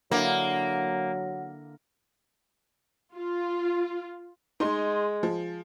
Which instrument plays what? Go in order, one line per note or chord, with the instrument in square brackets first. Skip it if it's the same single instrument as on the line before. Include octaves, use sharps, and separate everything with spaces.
[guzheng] D3 E4 [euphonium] F#3 [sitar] A#3 [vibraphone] F#5
[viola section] F4
[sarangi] G#3 [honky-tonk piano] D#4 C6
[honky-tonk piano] F3